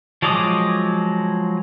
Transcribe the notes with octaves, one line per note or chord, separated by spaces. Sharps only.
F3 F#3 G#3 D6 D#6